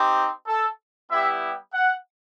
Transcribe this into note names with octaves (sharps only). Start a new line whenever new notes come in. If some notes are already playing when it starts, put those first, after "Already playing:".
Already playing: C4 D#4 G4
A4
G3 B3 E4 G4 E5
F#5